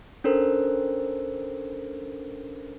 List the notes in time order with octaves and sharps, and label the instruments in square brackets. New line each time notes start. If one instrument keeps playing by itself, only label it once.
[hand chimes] C#4 D4 A4 A#4 C5